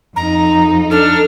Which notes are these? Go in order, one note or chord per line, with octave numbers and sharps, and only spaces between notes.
F2 D#4 A#5
D4 A4 F6